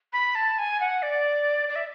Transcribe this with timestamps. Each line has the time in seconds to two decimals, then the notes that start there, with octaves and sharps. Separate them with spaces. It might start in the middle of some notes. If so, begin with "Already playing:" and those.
0.13 B5
0.35 A5
0.58 G#5
0.80 F#5
1.02 D5
1.69 D5
1.76 E5